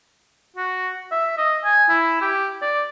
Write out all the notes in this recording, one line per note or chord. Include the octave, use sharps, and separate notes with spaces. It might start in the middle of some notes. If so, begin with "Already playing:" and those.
F#4
E5
D#5
G#5
E4
G4
D5